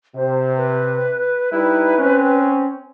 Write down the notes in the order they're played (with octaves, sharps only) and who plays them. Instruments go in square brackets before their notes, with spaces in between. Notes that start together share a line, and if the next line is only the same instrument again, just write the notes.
[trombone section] C3 [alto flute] C5
[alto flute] B4
[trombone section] G3 D#4 E4 [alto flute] B4
[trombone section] C4 C#4